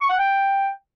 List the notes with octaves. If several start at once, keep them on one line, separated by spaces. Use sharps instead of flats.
C#6
F#5
G5